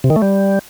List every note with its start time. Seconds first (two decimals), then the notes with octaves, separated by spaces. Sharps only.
0.04 C3
0.10 D#3
0.16 A3
0.22 G3